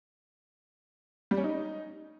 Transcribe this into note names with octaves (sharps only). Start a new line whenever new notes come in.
G3
C#4
D#4